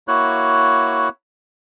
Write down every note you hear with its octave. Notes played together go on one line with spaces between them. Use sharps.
A#3 E4 F#4 C#5 F#6